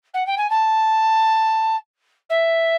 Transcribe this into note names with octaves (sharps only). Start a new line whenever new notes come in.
F#5
G5
G#5
A5
E5